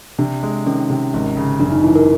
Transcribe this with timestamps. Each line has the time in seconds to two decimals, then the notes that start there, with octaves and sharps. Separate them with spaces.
0.18 C3 D4
0.43 G#3
0.66 D#3 C#4
0.90 C3
1.14 G#1
1.37 C#3
1.60 F#2 D4
1.72 D#4
1.84 E3 E4
1.95 A#4